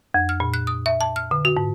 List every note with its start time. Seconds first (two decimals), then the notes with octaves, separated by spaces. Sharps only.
0.14 F2
0.29 F6
0.40 A#2
0.54 F#6
0.67 D#6
0.86 E5
1.01 A5
1.16 F6
1.31 D3
1.45 F#4
1.57 G#2